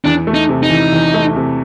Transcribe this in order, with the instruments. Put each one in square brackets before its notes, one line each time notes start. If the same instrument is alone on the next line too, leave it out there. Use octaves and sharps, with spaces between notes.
[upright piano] E2 [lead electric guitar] D4
[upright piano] A3
[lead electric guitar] D#4
[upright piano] C3
[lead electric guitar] D#4
[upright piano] E3
E2
A3
C3